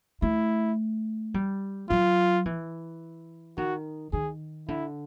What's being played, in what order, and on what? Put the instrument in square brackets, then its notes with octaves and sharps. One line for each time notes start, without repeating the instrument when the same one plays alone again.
[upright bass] A3 [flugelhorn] E4
[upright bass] G3
[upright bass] F#3 [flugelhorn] F4
[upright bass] E3
[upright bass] D#3 [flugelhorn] F#4
[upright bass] D#3 [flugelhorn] G#4
[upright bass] D3 [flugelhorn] E4